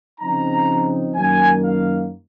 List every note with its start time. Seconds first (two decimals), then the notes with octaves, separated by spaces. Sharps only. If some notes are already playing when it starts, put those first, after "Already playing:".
0.20 C#3 F3 C4 D#4 A#5
1.16 F#2 D#3 F#3 A#3 G#5
1.64 F5